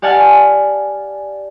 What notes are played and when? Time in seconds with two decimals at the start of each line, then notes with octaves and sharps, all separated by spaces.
0.02 G4 D5 F#5 G#5 A5 F6